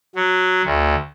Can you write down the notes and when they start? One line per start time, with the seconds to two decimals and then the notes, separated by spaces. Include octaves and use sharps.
0.16 F#3
0.65 D2